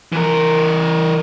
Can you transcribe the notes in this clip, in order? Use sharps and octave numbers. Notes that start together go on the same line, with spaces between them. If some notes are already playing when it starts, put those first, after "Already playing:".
E3 A#4